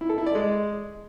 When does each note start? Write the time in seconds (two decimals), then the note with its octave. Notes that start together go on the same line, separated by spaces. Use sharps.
0.01 E4
0.09 A4
0.18 E4
0.26 D5
0.35 G#3